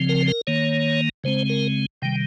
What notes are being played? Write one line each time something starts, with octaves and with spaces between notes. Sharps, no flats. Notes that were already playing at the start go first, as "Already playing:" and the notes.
Already playing: C#3 F3 C4
A#4
A#4
D#3 A#3 C#5
C#3 G#3 C4 C5
A#4
C3 D#3 G3 G5